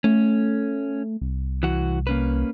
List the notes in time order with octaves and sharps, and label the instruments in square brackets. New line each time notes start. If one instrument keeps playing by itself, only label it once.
[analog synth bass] A3 [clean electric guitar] C#4
[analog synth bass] C2
[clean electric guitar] E3 F#4
A#3 C#4 B4